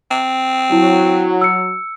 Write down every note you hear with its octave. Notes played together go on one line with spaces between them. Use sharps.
C4
F#3 E4
E6 C#7